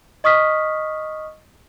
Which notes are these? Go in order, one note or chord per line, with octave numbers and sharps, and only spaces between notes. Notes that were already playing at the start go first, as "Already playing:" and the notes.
D#5 C#6 D#6 F6 B6